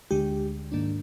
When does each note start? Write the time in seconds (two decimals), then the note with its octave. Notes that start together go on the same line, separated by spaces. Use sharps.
0.11 D2 D3 G#3 G4
0.72 G#2 D#3 A#3 D4